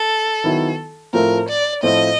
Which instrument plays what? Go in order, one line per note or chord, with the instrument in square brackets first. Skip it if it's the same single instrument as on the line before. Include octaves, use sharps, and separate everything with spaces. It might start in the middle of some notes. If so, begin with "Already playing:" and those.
Already playing: [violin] A4
[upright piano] D#3 F#3 B3 E4
[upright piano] A2 F3 A3 C4 F4 [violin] A#4
[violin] D5
[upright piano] A2 F3 A3 C4 F4 [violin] D#5